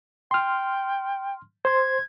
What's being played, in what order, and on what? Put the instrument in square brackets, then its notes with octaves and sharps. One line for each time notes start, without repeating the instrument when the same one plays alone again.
[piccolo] G5 [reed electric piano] C6 F6
[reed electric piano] C5 C6 [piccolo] G#6